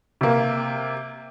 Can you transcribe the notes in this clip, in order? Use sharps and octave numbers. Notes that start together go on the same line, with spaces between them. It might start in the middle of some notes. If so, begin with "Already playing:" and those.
C3 A#3